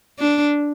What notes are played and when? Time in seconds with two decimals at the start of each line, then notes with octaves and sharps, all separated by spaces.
0.19 D4